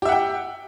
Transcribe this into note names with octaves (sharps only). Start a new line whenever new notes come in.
G4 E5 F#5 G5